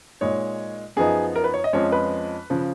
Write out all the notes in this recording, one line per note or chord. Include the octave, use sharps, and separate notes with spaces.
A#2 G#3 D#4 C#5
F#2 F3 B3 D#4 G#4
A#4
B4
C#5
D#5
F2 F3 G#3 C#4 C#5
B4
C#3 F3